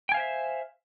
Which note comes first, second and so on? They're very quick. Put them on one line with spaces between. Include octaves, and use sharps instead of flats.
G5 G#5 F5 C5 E5